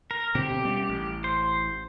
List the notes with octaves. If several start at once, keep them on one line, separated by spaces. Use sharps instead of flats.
A#4
B2 D3 C4 G4
G3 C#4
A1
C5